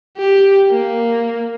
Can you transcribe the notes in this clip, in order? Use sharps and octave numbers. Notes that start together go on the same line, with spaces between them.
G4
A#3